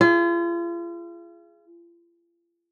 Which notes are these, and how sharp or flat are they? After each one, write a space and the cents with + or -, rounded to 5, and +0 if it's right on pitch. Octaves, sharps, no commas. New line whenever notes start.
F4 -40 G#4 +0